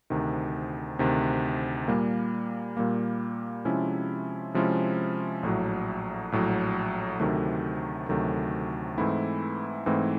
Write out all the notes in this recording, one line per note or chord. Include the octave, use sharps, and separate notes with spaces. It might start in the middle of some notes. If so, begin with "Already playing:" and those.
D2 C3 D#3
D2 C3 D#3
A#2 G3 A#3
A#2 G3 A#3
C3 F3 G#3 C#4 E4
C3 F3 G#3 C#4 E4
A#1 A2 F#3
A#1 A2 F#3
D2 C3 D#3 F#3 A3
D2 C3 D#3 F#3 A3
G#2 E3 A3 C4 E4
G#2 E3 A3 C4 E4